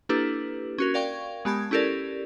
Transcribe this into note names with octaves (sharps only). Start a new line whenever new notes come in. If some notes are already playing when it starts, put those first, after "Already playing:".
A#3 D4 E4 G4 A4 B4
C#4 F#4 A#4
A#4 D5 F5 G5 C#6 G#6
G#3 B3 G4 A5 B5 G#6
C#4 E4 G4 A4 A#4 D5